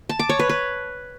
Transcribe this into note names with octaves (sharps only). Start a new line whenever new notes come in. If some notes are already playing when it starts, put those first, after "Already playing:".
A5
D6
C#5
B4
B4